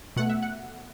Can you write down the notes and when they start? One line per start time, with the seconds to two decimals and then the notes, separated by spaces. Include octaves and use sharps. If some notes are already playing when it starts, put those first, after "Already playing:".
0.16 B2 A3 F#5
0.29 E5
0.42 F#5